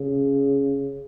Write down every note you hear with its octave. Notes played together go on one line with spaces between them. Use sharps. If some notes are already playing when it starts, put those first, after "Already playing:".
Already playing: C#3